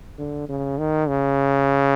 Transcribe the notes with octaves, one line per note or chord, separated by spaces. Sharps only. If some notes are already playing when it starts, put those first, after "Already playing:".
D3
C#3
D#3
C#3